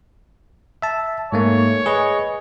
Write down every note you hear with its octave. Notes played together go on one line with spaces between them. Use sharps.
E5 A5
G#2 A3 A#3 C#5
G#4 B4 D#5